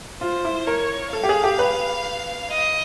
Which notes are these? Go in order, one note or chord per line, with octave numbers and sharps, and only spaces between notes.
F4 C5
E4
A#4 C#5
A4 F5
G4
G#4
G4
B4
D#5